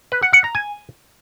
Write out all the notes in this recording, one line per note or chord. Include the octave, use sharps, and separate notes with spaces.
B4
F#5
F#5
A#5
G#5